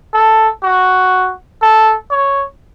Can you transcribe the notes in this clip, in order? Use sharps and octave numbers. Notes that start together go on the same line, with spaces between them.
A4
F#4
A4
C#5